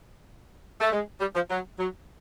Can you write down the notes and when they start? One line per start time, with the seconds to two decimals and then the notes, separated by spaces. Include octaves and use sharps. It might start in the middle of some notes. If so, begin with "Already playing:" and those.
0.81 A3
0.91 G#3
1.20 G3
1.35 F3
1.49 F#3
1.78 F#3